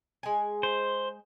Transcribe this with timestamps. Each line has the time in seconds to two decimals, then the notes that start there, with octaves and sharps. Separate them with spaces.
0.23 G#3 G#5
0.63 C5